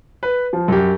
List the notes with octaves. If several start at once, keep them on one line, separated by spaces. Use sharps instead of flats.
B4
F3
F#2 G4